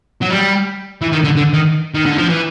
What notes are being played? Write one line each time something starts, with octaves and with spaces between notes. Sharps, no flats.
F#3
G3
E3
D#3
D3
D3
D#3
D#3
D3
F3
E3